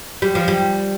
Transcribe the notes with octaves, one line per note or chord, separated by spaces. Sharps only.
G3
F3
G3